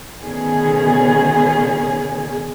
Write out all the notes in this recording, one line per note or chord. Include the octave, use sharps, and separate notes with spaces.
B2 D3 D#3 A3 C#4 G#4